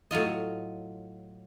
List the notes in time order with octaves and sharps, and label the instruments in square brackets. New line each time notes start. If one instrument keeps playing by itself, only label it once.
[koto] A2 F#3 F4 D#5